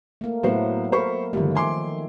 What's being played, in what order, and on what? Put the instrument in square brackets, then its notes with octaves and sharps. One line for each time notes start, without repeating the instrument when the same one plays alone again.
[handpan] A3 A#3
[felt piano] A2 F#4 C5 [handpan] F#3 A3 B3
[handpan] A#4 [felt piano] C5 B5 C#6
[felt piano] G1 G3 [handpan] D#3 F3 A3
[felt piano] G#5 C6 D6